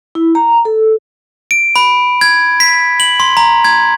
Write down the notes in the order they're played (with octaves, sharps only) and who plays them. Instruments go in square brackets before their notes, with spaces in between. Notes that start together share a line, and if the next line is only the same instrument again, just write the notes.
[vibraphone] E4
A#5
A4
[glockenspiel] D7
B5
G#6
B6
F#7
C6
A#5
G#6